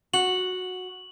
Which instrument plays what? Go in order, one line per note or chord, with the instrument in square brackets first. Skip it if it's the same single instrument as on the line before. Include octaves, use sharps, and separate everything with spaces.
[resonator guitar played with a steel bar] F#4 [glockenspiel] F#7